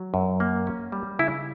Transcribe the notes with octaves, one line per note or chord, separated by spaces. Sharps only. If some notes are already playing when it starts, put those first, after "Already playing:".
Already playing: F#3
F#2
A#3
C#4
G3
C#3 E4